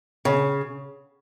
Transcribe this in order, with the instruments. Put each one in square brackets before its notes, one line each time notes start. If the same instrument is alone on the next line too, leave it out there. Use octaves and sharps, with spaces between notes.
[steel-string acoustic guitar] C#3